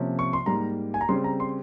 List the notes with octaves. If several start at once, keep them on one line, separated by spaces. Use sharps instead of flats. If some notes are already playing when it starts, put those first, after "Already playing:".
Already playing: C3 F3 A#3 C#4
C#6
C6
G#2 G3 A#3 A#5
G#5
A#5
C#3 G3 C4 C6
A#5
C6